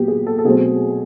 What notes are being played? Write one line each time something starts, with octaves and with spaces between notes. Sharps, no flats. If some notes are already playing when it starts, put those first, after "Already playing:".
Already playing: A#2 F#3 B3 G4
G#4
A4
A4
B2 F#3 A3 C4 G#4